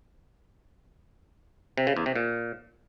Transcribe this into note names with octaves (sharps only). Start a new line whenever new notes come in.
C3
C#3
E2
C3
A#2